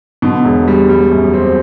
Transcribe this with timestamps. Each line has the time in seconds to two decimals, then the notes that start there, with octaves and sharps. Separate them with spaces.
0.22 B2 D3
0.45 E1
0.68 G3
0.89 G3
1.12 F#2
1.34 C4